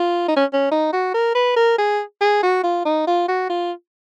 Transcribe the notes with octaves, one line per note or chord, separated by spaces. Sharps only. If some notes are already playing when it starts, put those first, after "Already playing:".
Already playing: F4
D#4
C#4
C#4
D#4
F#4
A#4
B4
A#4
G#4
G#4
F#4
F4
D#4
F4
F#4
F4